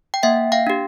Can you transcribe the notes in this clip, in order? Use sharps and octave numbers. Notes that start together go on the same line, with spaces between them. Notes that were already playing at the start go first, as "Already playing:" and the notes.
G5
A#3 E5 F#5
F5 G5
D4 G4